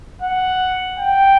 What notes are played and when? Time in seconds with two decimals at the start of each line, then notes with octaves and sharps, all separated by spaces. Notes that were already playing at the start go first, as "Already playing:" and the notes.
0.22 F#5
0.99 G5